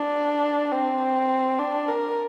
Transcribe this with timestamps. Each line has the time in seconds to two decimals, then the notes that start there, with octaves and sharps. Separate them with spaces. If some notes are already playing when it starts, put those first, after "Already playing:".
Already playing: D4
0.72 C4
1.59 D4
1.88 A#4